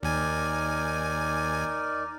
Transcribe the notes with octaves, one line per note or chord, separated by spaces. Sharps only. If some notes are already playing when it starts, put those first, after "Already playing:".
D#2 D#4 A#4 D5 G#5